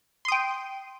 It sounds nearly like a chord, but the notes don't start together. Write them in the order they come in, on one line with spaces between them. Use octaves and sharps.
C6 D#6 G5